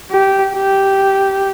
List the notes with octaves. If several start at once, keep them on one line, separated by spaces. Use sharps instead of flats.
G4
G4